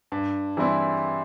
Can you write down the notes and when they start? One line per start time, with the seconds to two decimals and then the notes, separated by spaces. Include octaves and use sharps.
0.12 G2
0.57 E3 G3 C4 E4